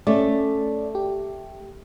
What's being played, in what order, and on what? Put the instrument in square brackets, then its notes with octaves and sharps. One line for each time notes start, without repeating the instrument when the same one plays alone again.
[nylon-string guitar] A3 [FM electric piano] C#4 D5
[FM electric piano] G4